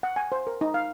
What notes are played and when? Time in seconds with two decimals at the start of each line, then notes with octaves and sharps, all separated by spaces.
0.03 F#5
0.16 G#5
0.32 C5
0.47 A#4
0.61 D#4
0.74 F5